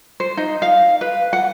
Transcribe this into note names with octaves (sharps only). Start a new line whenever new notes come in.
C5
D#4
F5
B4
F#5